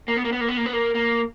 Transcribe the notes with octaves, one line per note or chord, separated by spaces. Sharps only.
A#3
B3
A#3
B3
A#3
B3
A#3
B3
A#3
A#3